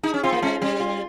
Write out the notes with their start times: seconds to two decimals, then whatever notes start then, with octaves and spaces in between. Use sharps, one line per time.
0.03 D#4 G#4
0.14 C#4
0.23 C4 F4
0.32 A#3
0.42 G#3 C#4
0.62 G3 C#4
0.80 F4